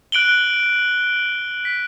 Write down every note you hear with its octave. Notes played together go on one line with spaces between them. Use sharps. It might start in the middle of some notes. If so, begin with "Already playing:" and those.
F#6 D7 F#7 G7
B6